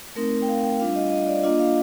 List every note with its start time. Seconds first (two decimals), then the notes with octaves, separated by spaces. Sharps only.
0.15 A3 C4 D#4 A#4
0.42 G5
0.49 F5
0.64 G5
0.80 G3 D4 F4 F5
0.95 D#5
1.12 D#5
1.27 D5
1.43 A#3 D4 F4 D#5
1.59 F5